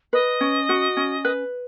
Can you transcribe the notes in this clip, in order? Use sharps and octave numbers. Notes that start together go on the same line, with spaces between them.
B4 D#5
C#4
F#4
C#4
B4